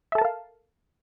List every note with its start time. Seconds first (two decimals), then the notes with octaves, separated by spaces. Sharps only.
0.12 E5
0.15 A4
0.18 A5
0.21 A#4
0.25 F5